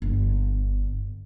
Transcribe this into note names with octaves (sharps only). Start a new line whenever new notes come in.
G1